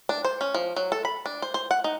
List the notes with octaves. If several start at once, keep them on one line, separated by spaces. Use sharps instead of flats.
D4
C5
C#4
F3
F#3
A4
B5
D4
C5
C5
F#5
D#4